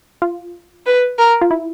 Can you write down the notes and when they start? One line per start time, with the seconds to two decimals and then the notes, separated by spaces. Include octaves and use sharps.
0.22 F4
0.86 B4
1.18 A#4
1.41 F4
1.51 E4